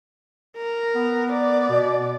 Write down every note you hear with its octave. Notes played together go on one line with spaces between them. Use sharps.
A#4
B3
D5
B2